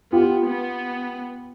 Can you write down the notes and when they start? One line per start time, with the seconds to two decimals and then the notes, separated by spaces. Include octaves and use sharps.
0.12 B3 F4 G4
0.46 B3